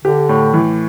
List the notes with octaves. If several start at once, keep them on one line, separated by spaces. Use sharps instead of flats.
D3 G4
A2
E3